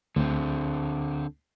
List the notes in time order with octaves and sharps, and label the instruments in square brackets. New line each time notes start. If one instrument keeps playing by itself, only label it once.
[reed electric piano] D2 [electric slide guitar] D3 C4